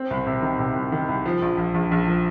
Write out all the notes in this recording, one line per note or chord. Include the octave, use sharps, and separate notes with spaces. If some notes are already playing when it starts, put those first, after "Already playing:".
Already playing: C4
C2
C3
D#3
C3
C2
D#3
C2
F3
A#1
A#1
A#1
A#1
F3